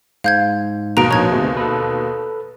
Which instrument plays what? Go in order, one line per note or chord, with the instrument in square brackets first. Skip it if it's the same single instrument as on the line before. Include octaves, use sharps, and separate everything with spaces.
[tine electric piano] G#2 [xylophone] F5 G6 G#6
[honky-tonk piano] D#2 B2 [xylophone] A#5 D7
[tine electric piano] A#1 C#5 [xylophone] A#5 G#6
[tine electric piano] D2 C3 G#4
A4 B4